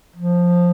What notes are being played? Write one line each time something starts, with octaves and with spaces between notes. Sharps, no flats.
F3